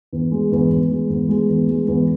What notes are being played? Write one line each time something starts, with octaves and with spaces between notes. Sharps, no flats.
E2
G#3
E2
E2
G#3
E2
G#3
E2
G#3
E2